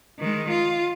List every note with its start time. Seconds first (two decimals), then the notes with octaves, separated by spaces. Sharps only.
0.19 D#3 G#3
0.49 F4